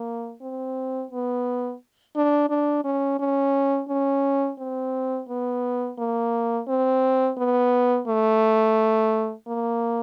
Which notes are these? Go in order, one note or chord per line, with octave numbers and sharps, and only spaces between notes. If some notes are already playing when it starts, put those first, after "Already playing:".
Already playing: A#3
C4
B3
D4
D4
C#4
C#4
C#4
C4
B3
A#3
C4
B3
A3
A#3